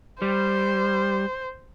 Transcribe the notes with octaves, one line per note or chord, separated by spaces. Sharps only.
G3 C5